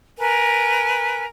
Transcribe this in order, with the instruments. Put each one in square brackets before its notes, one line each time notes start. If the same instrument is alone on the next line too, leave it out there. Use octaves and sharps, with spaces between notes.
[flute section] A#4 B4 G#5